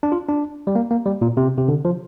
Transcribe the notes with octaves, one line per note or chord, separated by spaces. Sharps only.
D4
F4
D4
G3
A#3
A#3
G3
A#2
C3
C3
D3
F3